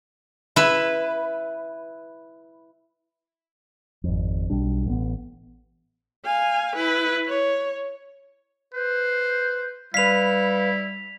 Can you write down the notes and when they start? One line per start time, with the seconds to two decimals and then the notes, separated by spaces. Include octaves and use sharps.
0.56 E4 B4
4.04 G#1 F2
4.50 B1 G3 D4
4.86 A1 B3
6.25 F5 G#5
6.75 E4 B4
7.27 C#5
8.74 B4 C5
9.94 G3 E4 B4 F5 B6 F7